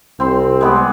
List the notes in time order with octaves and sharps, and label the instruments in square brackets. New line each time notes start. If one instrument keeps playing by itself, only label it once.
[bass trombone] C2 [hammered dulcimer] C4 C6
[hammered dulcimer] G#3 B3 G4